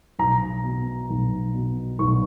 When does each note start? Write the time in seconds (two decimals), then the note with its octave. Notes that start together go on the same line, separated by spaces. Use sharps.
0.19 B1 A#5
0.64 B2
1.10 B1
1.54 B2
1.99 B1 C#6